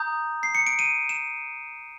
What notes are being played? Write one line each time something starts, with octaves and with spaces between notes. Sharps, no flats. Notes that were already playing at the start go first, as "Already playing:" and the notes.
Already playing: A#5 D#6 G6
C7
C#7
D7
D#7
E7